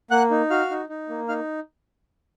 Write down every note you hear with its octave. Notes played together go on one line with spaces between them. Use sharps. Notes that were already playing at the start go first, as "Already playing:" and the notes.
A#3 F#5 F#6
D#4
F#4 F5 F6
D#4
D#4
A#3
D#4 F5 F6